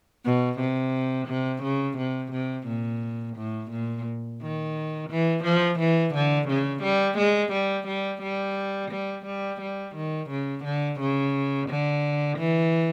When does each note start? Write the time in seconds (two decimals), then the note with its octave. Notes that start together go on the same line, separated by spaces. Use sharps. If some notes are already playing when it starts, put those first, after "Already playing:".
0.25 B2
0.59 C3
1.28 C3
1.63 C#3
1.98 C3
2.32 C3
2.67 A#2
3.37 A2
3.71 A#2
4.41 D#3
5.10 E3
5.44 F3
5.79 E3
6.15 D3
6.49 C#3
6.83 G3
7.18 G#3
7.52 G3
7.88 G3
8.22 G3
8.91 G3
9.26 G3
9.61 G3
9.96 D#3
10.30 C#3
10.65 D3
11.00 C#3
11.69 D3
12.38 E3